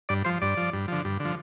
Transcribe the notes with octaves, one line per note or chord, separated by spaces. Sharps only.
G2 D5
F3 C5
G2 D5
F3
G2
D3 F3
G2
D3
F3